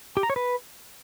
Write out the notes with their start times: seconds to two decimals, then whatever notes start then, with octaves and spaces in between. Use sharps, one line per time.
0.17 G4
0.23 A#5
0.30 C#5
0.36 B4